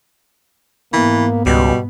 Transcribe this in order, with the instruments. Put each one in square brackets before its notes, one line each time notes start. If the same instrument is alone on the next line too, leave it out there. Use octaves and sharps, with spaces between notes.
[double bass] G#2 B3 [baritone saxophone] E3 [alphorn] A#3
[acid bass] C#2 [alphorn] B2 [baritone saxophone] G3